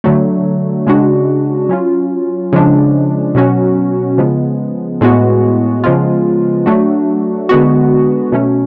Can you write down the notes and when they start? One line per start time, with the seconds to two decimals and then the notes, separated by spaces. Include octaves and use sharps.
0.04 D3 F#3 A3
0.87 C#3 G#3 D4 F#4
1.69 F#3 C#4 F4
2.52 C#3 F3 G#3 D4
3.35 B2 F#3 C#4 F#4
4.18 C#3 F3 G#3 B3
5.01 A2 G#3 B3 F#4
5.84 C#3 F3 G#3 B3 F4
6.66 F#3 A3 D4 F#4
7.49 D3 G#3 B3 F#4
8.32 B2 F#3 A3 C#4